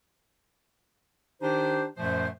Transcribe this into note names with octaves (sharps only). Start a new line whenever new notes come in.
D#3 D4 D#4 G4 C5
F#2 A#2 F3 A3 C5